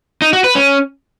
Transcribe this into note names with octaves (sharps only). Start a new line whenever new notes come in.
D#4
F#4
B4
C#4